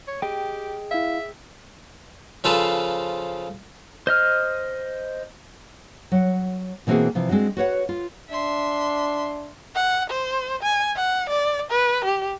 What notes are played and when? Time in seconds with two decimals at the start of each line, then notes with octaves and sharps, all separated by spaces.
0.08 C#5
0.22 G4 G#4 D#5 G5
0.91 E4 E5 F5
2.44 C#3 F3 F4 A4 B4 C5
4.07 C5 D#5 F6
6.12 F#3 F#5
6.87 B2 E3 A#3 C4 F#4 G#4
7.15 C3 E3 F3
7.29 G#3 C4 D4 F#4
7.57 F#4 B4 C#5 F#5
7.89 F4
8.29 D4 E5 C6
9.75 F#5
10.10 C5
10.63 G#5
10.96 F#5
11.30 D5
11.71 B4
12.05 G4